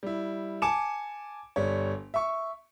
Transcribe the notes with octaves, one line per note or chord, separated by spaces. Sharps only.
G3 E4
G#5 A5 D6 C#7 E7
G1 G3 C#5
E5 C#6